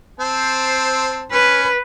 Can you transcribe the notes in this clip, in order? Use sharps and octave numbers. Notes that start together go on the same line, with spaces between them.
C4 C5 A5
C#4 B4